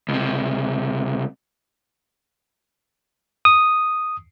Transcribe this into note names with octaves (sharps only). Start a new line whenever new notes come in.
C#2 C3
D#6